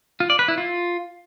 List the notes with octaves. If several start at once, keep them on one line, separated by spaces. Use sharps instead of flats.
F4
D5
B4
E4
F4